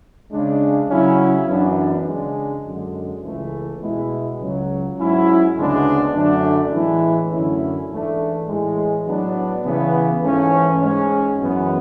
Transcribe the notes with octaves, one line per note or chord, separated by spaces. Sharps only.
C#3 G#3 D4
C#3 F#3 C#4 E4
F#2 E3 B3 D4
C#3 G#3 D4
F#2 D3 G#3
C#2 C#3 E3 A3
B2 G#3 B3 E4
C#2 C#3 F#3
G#2 F#3 C#4 E4
D2 C#3 G#3 B3 D4
F#2 D3 A3 D4
A2 E3 G#3 B3 E4
F#2 D3 A3 C#4 E4
G#2 E3 A3 D4
A2 E3 G#3
A2 F#3 B3 D4
C#3 E3 B3
G#2 E3 A3 C#4
G#2 G#3 C#4
F#2 E3 G#3 B3